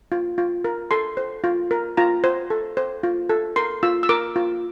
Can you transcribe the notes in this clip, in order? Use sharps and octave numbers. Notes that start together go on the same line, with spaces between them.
F4
F4
A#4
A4 C6
C5
F4
A#4
F4 A#5
C5
A4
C5
F4
A4
A#4 C6
F4 E6
E6
A#4 D6
F4